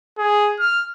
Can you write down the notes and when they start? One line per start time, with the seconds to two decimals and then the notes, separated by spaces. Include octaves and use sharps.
0.18 G#4
0.60 F6